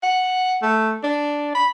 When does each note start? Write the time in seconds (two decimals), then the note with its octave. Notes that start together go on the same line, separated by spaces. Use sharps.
0.03 F#5
0.62 A3
1.04 D4
1.55 B5